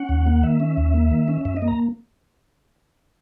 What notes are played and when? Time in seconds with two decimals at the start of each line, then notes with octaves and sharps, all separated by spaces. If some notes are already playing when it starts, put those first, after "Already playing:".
Already playing: C#4 F#5
0.09 D#2
0.27 A#3
0.43 D#3 E5
0.60 C#4
0.77 D#2
0.94 A#3
1.11 D#3
1.28 C#4
1.45 F#2 E5
1.56 D#5
1.62 A#3
1.68 A#5